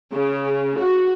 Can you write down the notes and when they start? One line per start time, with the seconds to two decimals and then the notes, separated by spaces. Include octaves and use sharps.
0.11 C#3
0.78 F#4